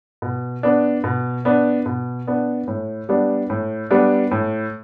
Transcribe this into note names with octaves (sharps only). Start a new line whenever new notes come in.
B2
B3 D4
B2
B3 D4
B2
B3 D4
A2
G3 B3 D4
A2
G3 B3 D4
A2